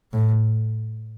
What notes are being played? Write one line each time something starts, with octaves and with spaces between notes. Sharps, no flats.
A2